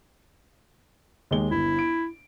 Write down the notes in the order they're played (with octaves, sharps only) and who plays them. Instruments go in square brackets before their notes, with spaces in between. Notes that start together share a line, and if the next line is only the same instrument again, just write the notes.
[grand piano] D#2 G#3 G7
[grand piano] G1 [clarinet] E4
[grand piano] D7